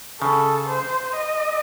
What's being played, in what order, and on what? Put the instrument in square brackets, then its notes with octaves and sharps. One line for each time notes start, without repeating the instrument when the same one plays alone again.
[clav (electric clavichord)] C#3 [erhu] A4
[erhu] C5
D#5